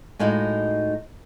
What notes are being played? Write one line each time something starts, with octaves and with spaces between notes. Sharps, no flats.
A2 G#3 D#4 F#4 F5